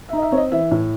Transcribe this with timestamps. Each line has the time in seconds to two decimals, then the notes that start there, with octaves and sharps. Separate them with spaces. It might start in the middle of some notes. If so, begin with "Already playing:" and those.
0.09 E5
0.13 D#4
0.18 D#5
0.22 E5
0.32 C4 C#5
0.37 D#5
0.52 E3 E5
0.71 A2